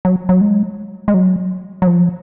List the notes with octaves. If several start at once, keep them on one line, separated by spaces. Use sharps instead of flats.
F#3
F#3
G#3
G#3
F#3
F#3
F3